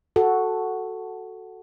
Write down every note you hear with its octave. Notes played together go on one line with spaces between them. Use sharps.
F#4 A4